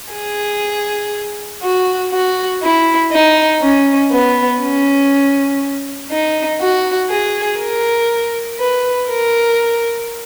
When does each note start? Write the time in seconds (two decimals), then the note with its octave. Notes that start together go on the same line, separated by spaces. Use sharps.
0.13 G#4
1.62 F#4
2.12 F#4
2.62 E4
3.12 D#4
3.62 C#4
4.11 B3
4.61 C#4
6.10 D#4
6.60 F#4
7.10 G#4
7.59 A#4
8.59 B4
9.09 A#4